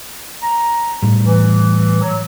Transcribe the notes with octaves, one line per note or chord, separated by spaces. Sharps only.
A#5
A2 G3
E3
F#3